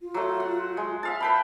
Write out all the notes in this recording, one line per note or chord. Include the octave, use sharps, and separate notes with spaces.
F4
F#3 A3
F#5
G#3
E5 F5 A5
B4 G5 A5 B5